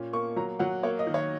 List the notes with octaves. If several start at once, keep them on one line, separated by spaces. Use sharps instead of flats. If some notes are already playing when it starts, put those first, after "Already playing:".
Already playing: A#2 C#4
A#3 C#6
F#3 A#5
F#3 F#5
A#3 C#5
D#5
D#3
C#5